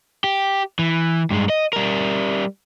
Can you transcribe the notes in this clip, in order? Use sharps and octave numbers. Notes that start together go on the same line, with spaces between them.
G4
E3
G2 G#3
D#5
G3 A#4